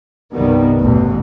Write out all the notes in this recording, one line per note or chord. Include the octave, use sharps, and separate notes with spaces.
C2 G2 D#3 G3 B3
A1 E2 B2